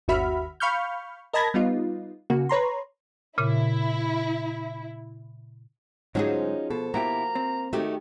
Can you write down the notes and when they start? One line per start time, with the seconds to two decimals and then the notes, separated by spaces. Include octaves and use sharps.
0.08 G1 D#2 F#4 E5 B5 F6
0.60 F5 B5 C#6 F6 G6
1.33 A#4 D#5 A5 B5 G#6 A#6
1.54 G3 B3 D#4 F4
2.30 C#3 A#3 F#4
2.49 B4 C#5 A#5 C6
3.38 A#2 C#3 E4
6.15 D2 G#2 F3 F#3 C#4 D#4 F#4 G#4
6.70 B2 A4
6.94 B2 A#3 E4 F#4 G4 A#5
7.35 C4
7.73 D#3 A3 D#4 F#4 G4